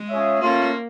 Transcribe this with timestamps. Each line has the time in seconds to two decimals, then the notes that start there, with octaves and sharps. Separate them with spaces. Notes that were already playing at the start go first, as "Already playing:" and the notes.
Already playing: G#3
0.10 C#4 F4 G#4 C#5 E5
0.41 A3 A#3 C#4 F4